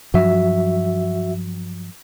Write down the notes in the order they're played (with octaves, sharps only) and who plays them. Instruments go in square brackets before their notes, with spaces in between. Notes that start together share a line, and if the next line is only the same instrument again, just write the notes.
[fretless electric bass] G2 F3 F#3 [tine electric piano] F#4 E5